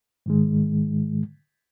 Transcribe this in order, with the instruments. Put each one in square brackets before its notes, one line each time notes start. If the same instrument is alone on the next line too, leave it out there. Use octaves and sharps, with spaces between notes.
[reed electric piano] G#2 D#3 G#3